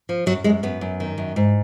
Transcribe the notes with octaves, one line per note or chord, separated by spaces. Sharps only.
F3
F#2 F#3
F#2 G#3
F#2 B3
F#2
D#3
F#2
G#2